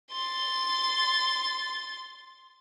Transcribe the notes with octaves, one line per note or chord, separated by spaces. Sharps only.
C6 A6